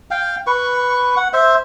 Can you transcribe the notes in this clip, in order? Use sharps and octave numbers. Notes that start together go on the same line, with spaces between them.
F5 G5
B4 C#6
F#5
C5 E5